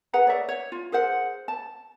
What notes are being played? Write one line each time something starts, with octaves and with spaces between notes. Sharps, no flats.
G#4 B4 F#5 A#5
C#5 D5 E5
C#5
F4
G#4 A#4 C5 F#5
A5